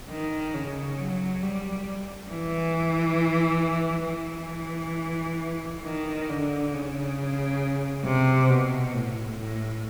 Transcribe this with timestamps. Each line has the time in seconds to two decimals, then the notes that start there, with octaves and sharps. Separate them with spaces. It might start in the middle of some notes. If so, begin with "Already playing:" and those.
0.10 D#3
0.54 C#3
0.99 F#3
1.43 G3
2.31 E3
4.08 E3
5.85 D#3
6.29 D3
6.73 C#3
8.06 C3
8.50 B2
8.94 A2
9.39 A2